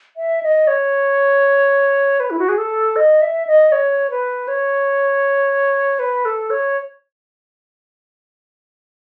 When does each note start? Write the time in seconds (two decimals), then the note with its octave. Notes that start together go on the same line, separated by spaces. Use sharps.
0.17 E5
0.43 D#5
0.67 C#5
2.20 B4
2.30 E4
2.39 F#4
2.49 G#4
2.58 A4
2.96 D#5
3.22 E5
3.47 D#5
3.72 C#5
4.10 B4
4.48 C#5
5.99 B4
6.25 A4
6.50 C#5